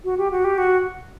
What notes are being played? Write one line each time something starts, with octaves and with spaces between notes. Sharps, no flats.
F#4
G4
F#4
G4
F#4